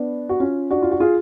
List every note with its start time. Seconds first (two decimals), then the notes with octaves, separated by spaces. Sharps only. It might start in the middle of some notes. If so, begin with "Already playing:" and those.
Already playing: B3 D4
0.29 F#4
0.40 C#4 F4
0.70 D4 F#4
0.82 F4
0.92 F#4
1.00 F4 G#4